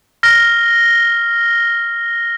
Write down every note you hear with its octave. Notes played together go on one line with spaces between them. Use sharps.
F6 A#6 G7